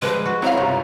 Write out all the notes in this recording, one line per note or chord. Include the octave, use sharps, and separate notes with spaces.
F3 G3 G#3 B4
F#4
F#3 C4 E4 C#5 F5 A#5
C#2 G2 C3 C#5